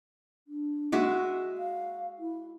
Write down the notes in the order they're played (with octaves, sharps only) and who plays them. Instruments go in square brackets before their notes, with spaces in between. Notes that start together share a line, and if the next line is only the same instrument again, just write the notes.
[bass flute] D4
[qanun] G#3 F#4 E5
[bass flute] F5
E4